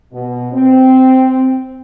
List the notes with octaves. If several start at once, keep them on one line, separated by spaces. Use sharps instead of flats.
B2
C4